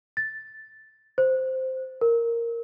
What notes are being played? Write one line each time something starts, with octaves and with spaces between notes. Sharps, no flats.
A6
C5
A#4